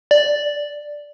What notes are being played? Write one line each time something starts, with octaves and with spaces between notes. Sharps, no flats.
D5